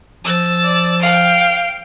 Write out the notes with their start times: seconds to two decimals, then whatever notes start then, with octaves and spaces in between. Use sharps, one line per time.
0.24 F3 E6 A6
0.64 D5
1.01 F5 G5